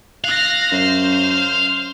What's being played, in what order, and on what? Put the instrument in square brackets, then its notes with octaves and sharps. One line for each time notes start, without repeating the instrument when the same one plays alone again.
[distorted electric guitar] F5 [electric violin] F#6 A#6
[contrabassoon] F#2 [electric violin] C5